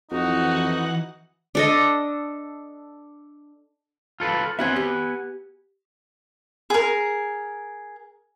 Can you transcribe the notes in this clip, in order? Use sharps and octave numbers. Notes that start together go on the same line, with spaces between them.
F2 E3 D#4 F#4 F#5 F#6
D4 A4 D#5
F4 A4 B4
B3 C4 F#4 E5 F#5 G#5
G4
G#4 A#4